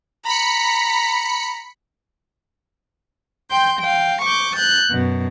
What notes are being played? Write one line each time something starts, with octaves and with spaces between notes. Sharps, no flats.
A#5 B5 B6 C#7
G5 C6 G6
F5 G5
C#6 D6 G6
F#6 G6 A6
F#2 B2